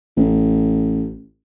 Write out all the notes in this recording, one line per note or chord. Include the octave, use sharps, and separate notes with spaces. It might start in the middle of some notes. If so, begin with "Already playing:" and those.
A1